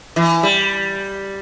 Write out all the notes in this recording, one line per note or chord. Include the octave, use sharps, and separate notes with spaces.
E3
G3